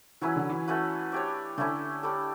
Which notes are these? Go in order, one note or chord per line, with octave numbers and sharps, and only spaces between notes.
E3 F#3 C#4 E4 B4
D3
E3
A3 C#4 F#4 B4
D4 G4 C#5
D3 A3 C#4 E4
G3 D4 A4